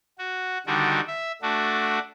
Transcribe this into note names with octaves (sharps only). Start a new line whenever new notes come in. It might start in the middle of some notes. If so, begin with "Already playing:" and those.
F#4
D3 D#3 G3 D4 F#4
E5
A3 D4 F#4